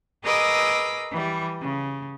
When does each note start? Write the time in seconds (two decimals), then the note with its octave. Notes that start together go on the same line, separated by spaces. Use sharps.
0.23 G#4 A#4 B4 D#5 D6 E6
1.11 E3 G3
1.60 C#3